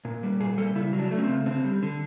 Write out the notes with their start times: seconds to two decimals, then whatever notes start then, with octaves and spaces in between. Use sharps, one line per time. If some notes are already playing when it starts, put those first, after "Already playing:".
0.05 A#2
0.23 G3
0.40 A#2 G#4
0.58 G3 A4
0.75 C#3 E4
0.93 F#3
0.99 D4
1.11 A3
1.18 C#4
1.24 C4
1.29 C#3
1.46 D3 C4
1.65 G3
1.83 D3